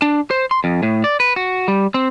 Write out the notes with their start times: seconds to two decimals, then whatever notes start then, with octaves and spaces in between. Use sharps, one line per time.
0.02 D4
0.31 C5
0.51 C6
0.64 F2
0.83 A2
1.04 D5
1.20 B4
1.36 F#4
1.68 G3
1.94 C4